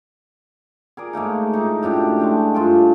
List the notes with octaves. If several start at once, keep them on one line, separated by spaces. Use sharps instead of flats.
G#4 A#4 D5
G#2 A3 A#3 D#4
A2 D#4
F#2 A2 D4 G4
G#3 A3 D4
G2 F4 G5